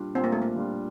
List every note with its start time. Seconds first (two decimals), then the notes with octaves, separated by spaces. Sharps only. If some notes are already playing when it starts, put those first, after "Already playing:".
Already playing: A#2 G3 D4 F4
0.15 A#2 C4
0.24 A#3
0.32 A3
0.42 A#3
0.56 G3 D4 F4